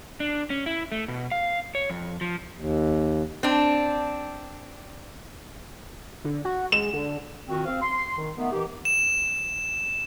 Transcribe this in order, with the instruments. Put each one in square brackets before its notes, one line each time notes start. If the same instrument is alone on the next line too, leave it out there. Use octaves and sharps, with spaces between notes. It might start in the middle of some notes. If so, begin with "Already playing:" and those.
[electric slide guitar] D4
C#4
E4
A3
B2
F5
C#5
F2
F3
[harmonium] D#2
[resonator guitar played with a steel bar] C4 D4
[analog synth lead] D3
F#4
[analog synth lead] G#3 [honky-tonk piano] E7
[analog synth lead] D3
[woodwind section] A#2 D#3 C4 F#4
C4 F5
C6
D#3
D#3 A3 B3
D#3 E3 G4
[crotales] E7